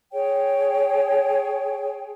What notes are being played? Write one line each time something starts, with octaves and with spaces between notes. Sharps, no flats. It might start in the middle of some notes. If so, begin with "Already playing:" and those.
G#4 C#5 G5